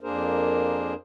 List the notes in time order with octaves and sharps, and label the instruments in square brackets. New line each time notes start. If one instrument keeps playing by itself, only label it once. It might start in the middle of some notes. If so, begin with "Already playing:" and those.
[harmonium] F2 A#3 D4 G#4 A#4 C5